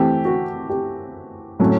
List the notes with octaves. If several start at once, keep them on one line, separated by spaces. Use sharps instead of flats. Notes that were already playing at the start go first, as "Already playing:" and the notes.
Already playing: E3 A3 C4 G4
F#4
G4
A2 F#3 A3 C#4